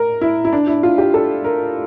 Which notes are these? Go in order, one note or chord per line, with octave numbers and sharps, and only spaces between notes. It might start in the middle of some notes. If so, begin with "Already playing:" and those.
Already playing: A#4
E4
E4
D4
E4
F4
G4
A4
A#4